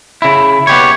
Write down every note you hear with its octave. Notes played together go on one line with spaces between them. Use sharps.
C#3 E4
B3 G4 C#5